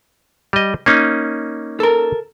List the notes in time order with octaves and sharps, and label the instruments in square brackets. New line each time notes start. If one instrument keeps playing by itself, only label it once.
[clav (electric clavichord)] G3 D#5
A#3 C#4 D#4
[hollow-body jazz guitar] A4 A#4